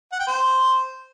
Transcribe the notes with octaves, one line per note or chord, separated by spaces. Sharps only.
F#5
G5
C5